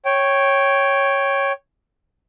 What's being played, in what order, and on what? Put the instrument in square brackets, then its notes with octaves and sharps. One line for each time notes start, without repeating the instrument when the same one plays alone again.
[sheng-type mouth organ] C#5 G5